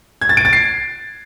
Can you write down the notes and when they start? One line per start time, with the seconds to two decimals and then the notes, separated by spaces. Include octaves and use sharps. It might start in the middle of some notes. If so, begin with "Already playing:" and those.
0.21 G#6
0.29 A6
0.37 D7
0.45 A6
0.53 C7